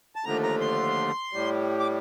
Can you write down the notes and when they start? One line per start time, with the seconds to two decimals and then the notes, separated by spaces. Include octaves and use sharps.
0.16 A5
0.24 D#2 D3 F3 A3 A#5
0.43 A#5
0.61 C6
1.33 A2 G3
1.80 D6